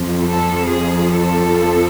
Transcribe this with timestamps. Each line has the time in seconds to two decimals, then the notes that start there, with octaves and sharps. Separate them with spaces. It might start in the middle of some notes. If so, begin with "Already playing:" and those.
Already playing: F2 F3
0.22 A4
0.69 G#4
1.16 A4